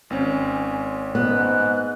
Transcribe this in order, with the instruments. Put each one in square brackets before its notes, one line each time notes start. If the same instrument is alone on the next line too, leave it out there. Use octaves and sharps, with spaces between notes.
[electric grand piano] G#1 C4 C#4 [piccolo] G#5
[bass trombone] G#2 [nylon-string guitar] B3 [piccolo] F#6